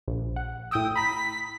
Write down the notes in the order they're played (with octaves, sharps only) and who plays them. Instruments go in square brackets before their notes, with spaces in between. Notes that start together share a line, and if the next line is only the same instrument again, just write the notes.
[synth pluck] A#1
F#5
[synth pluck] A2 G5 E6 [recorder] D#6
[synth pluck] A#5 B5 [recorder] B6